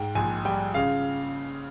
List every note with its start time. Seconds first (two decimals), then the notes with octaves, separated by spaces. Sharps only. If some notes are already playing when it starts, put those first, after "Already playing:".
Already playing: G#2 G5
0.15 A#1 G#5
0.45 G3 G5
0.74 C#3 F5